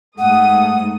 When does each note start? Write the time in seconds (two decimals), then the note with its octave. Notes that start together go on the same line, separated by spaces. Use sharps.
0.18 G#2 A3 F#5 D#6